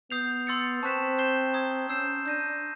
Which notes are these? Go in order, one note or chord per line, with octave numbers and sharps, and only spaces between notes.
B3 D#6 G6 C7 F7
C6 E6 A6 C#7
C4 A5 C#6 F#6 B6 E7
G6 C7 E7 G7
A#5 D#6 G#6
C#4 E6 G6 C7 E7
D4 G6 A#6 D#7